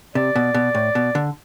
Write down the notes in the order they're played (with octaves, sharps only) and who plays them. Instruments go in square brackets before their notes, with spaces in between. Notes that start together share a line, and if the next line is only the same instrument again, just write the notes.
[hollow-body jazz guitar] C3 [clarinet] D5
[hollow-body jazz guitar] B2
B2
A2
B2
D3